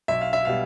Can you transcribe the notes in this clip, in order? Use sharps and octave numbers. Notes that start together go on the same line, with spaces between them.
B1 E5
F5
E5
B2 G3 F5